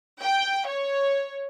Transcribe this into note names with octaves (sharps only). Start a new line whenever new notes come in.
G5
C#5